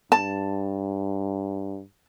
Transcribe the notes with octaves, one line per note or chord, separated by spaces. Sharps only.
G2 A5